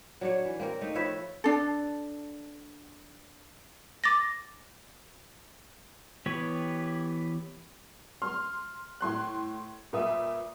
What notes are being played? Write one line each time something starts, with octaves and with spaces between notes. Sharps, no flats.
F#3 D4 C#5
E3
A#3 C4 A#4
A3 D#4
F3 B4 C#5 E5
D4 A4
D6 A6 A#6
E3 B3 G4 B4 C#5
C6 F6
A2 C6 F#6
A#2 B4 E5 D#6